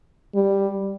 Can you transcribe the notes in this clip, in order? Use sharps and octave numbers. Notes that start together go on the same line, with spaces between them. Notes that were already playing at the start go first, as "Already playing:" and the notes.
G3